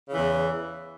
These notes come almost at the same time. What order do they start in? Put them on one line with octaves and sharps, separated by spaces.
C#3 E3 E2